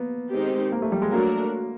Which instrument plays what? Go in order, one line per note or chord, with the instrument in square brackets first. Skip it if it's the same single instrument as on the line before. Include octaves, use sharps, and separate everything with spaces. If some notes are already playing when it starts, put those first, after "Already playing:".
Already playing: [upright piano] A#3 B3
[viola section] D#3 G#3 C4 D#4 G4
[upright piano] A#3
A3
G3
G#3
[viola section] F#3 A3 D4 F#4 A#4 [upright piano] A#3